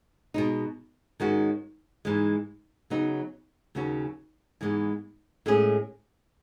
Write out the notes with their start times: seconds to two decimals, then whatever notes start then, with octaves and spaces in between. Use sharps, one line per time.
0.34 B2 G#3 D#4
1.20 G#2 D#3 G#3 C#4 F#4
2.05 G#2 E3 G#3
2.90 C#3 F#3 B3 D#4
3.75 D#2 C#3 F#3 C#4 F#4
4.61 G#2 E3 G#3 B3
5.46 A2 G#3 C#4 G#4